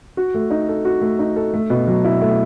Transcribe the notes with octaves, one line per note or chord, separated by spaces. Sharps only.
F#4
A3
D#4
A4
F#4
A3
D#4
A4
A3
B2
F#3
E4
A3